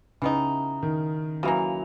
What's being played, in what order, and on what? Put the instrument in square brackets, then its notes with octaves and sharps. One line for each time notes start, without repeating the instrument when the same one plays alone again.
[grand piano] C#3 [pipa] E3 B3 D#4
[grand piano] D#3
[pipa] C#3 E3 A#3 [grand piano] F#3